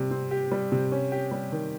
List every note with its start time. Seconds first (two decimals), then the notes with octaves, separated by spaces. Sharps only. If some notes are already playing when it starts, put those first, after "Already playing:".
Already playing: C3 G3
0.11 C4
0.31 G4
0.52 G3
0.72 C3
0.92 C#4
1.12 G4
1.31 G3
1.52 D#3